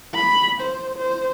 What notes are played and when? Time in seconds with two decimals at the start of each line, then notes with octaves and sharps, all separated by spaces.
0.15 B5
0.61 C5
0.98 C5